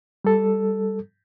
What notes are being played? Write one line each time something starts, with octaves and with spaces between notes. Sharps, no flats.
G3 A4